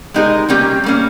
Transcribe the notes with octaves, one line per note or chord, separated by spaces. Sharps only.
G#3 D#4 G4 A#4
G3 A#3 C#4 G4
G3 A#3 C#4